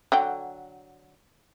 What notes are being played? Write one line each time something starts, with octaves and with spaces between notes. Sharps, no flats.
D3 F#3 G5